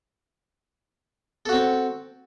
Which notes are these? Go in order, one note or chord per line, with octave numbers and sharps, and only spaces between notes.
C4 F#4 A4